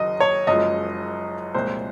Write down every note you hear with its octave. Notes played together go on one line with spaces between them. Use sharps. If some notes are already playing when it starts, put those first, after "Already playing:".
Already playing: F#1 F#2 D#3 F#3 D#5
C#5
F#1 F#2 F3 G#3 D#5
C2 A#2 F3 G#3 C5